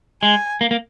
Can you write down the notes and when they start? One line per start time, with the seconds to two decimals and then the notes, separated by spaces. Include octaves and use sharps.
0.22 G#3 G#5
0.61 A#3
0.71 A#3